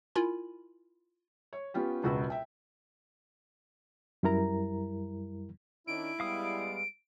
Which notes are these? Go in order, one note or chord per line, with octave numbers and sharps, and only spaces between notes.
E4 F4 A#4 G#5 B5
C#5
B3 C#4 F4 G4
E1 C#2 F#4 B4 E6
E5 G5
F#2 G3 E4 A#4 A#5
D#3 C#4 D4 E4 D7
G3 G#3 B3 F5 D#6